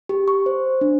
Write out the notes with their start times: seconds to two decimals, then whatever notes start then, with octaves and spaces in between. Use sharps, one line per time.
0.09 G4
0.28 C#6
0.46 C5
0.81 D4